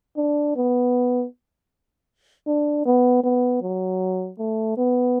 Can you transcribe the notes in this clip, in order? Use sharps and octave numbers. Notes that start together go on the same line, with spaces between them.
D4
B3
D4
B3
B3
F#3
A3
B3